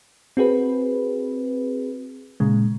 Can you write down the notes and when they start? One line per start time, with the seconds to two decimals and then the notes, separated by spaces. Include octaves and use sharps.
0.37 C4 F#4 G#4 B4
2.40 A#2 C#3 G#3